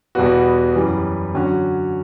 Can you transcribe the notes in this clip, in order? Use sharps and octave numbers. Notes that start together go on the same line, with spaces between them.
E2 B2 G3 B3 F#4
F#2 E3 G3
D3 F#3 C#4 F#4